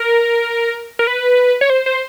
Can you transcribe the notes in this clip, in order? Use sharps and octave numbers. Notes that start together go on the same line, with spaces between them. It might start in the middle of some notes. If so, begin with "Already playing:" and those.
Already playing: A#4
A#4
B4
C#5
C5
C5